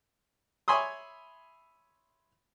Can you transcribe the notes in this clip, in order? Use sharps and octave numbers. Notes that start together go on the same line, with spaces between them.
C#5 E5 G#5 B5 C6 D#6